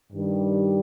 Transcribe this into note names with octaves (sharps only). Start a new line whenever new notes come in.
G2 D#3 G3